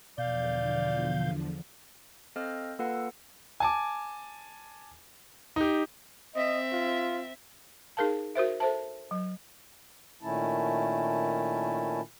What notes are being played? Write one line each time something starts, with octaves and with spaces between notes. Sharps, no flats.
E2 B2 D3 F3 D5 F5 G6
C4 A4 C5 D#5 F5 F6
A#3 F4 A4 B4 F5 F#5
G#5 A5 D6
D#4 G4
C4 D#5 E5
F4
D#4 G#4 A#4 F5 A5
F#4 A#4 C5 E5
A4 C5 E5 A5
F#3
A#2 D#3 A3 C#4 E4 A5